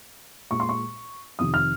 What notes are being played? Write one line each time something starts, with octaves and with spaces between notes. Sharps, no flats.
A#2 G#3 C#6
C6
C#6
F2 C3 D#3 D#6
F6